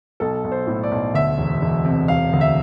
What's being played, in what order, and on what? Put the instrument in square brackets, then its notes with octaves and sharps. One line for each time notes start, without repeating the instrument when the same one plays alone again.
[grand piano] B1 A4
B1
C5
A2
D5
B1
D2 E5
E1
E1
C3
E1 F5
D2
E5